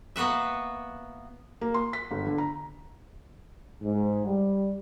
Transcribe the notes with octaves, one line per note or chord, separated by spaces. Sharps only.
A#3 B3 F#4 B4 E5
A#3
C6
B6
G1
D3
A#5
G#2
G3